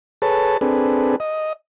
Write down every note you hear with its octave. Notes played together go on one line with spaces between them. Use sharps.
G#4 A4 B4 C#5 A5
C4 D4 G#4 A4 B4
D#5